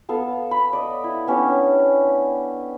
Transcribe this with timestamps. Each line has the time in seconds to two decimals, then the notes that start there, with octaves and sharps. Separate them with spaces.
0.09 B3 A4 F5
0.51 B5
0.73 D5 D#5
1.04 E4
1.27 B3 C#4 D4 G4